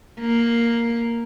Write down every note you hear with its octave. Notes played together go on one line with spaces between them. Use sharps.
A#3